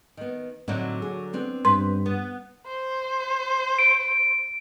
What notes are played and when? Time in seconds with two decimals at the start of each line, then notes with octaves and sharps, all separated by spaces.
0.17 D#3 B3
0.68 A2 D3 F#3 C4 D#4
1.02 G#4
1.33 B3 C4 D4
1.65 G2 B4 C6
2.06 B3
2.67 C5
3.79 D7